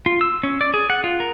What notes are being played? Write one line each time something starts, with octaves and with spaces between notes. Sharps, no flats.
F4
E6
C#4
D5
G#4
F#5
F4
A#4